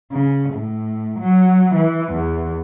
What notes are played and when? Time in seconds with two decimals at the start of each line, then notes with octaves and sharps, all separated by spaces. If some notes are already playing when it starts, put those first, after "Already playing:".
0.12 C#3
0.54 A2
1.20 F#3
1.75 E3
2.13 E2